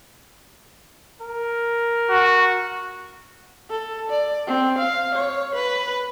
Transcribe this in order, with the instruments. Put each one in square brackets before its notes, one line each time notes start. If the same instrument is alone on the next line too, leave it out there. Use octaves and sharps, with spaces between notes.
[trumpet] A#4
[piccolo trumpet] F#4
[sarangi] A4
D5
C4
F5
C#5
B4